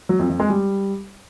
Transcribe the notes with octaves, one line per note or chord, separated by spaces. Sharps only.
F#3
F2
F2
G#3
G3